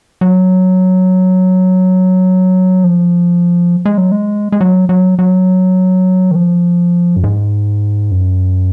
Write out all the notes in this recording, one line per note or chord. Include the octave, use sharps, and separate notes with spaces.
F#3
F3
G#3
F#3
G#3
G#3
F#3
F#3
F#3
D#3
F3
F#2
G#2
F#2